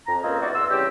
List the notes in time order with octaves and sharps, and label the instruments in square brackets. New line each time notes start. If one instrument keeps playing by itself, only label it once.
[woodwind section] F2 A#5
C#2 G#3 A#3 C4 C#4 D#5
B3 D#4 E4 F#4 C5 D5
E2 F#5 C6 E6
C#3 E3 G3 C4 G4